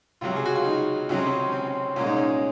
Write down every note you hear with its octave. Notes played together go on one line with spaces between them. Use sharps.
C#2 C3 F#3 F4
G#4
F#4
F4
D#4
C#2 C3 F#3 C#4
C4
C#4
C4
C2 A#2 G#3 C#4
D#4
C#4